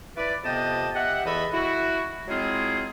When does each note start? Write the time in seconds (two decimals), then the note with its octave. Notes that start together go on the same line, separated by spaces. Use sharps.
0.17 E4 B4 D5
0.44 F2 C3 B3 D#5 G5 A5
0.94 G4 D#5 E5 F#5
1.26 E2 E3 A4 D#5 E5 B5
1.52 E4 F#4
2.28 F#3 G#3 C4 E4 F4 G#4